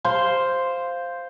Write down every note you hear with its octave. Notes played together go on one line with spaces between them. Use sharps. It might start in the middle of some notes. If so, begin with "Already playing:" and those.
C5 F5 C6